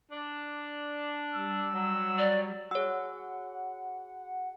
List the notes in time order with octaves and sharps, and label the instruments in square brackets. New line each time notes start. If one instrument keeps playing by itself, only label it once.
[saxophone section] D4
[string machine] G3 [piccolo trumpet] E6
[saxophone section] F#3
[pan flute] D5
[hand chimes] F#4 G#4 [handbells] C#5 E6 [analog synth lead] F#5